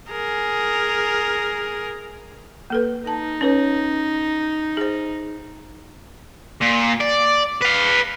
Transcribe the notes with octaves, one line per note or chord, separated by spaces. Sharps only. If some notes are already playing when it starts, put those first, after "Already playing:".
G#4 A#4
A#3 A4 B4
D#4 A5
C#4 B4 C#5
G#4 C5
A#2
D5
B4 F5